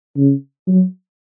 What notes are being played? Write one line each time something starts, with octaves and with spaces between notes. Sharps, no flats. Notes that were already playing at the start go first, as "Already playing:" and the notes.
C#3
F#3